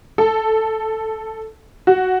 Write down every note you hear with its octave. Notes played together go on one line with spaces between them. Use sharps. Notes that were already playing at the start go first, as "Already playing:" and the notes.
A4
F#4